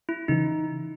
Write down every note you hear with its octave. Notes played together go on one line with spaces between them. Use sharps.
E4
C#3 E3 D#4